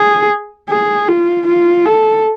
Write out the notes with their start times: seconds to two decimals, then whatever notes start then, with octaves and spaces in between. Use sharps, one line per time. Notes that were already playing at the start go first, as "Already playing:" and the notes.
Already playing: G#4
0.69 G#4
1.08 F4
1.47 F4
1.86 A4